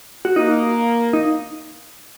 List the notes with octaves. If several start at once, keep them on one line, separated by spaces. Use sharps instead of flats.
F#4
A#3 D#4
D#4